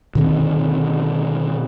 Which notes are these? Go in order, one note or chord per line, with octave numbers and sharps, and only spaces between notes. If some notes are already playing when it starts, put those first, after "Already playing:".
B2 D3 D#3 C4